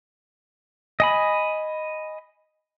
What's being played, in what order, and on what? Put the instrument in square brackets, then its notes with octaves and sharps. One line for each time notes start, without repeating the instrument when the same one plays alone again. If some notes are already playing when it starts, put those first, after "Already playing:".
[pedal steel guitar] D#5 G#5 B5